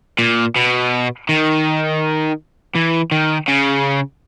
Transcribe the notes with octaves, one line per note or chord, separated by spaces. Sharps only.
A#2
B2
D#3
E3
D#3
C#3